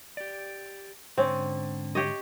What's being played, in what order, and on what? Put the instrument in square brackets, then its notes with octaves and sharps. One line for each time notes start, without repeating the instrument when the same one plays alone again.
[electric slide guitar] G4 D5
[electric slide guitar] G#2 D3 [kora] C4 C#4
[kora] G4 C#5 D#5